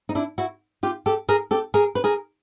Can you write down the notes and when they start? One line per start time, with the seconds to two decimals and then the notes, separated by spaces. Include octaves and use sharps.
0.09 D#4
0.15 D4 E4
0.38 E4 F#4
0.83 F4 G4
1.06 G4 A4
1.29 G#4 A#4
1.51 G4 A4
1.74 G#4 A#4
1.95 B4
2.04 G#4 A#4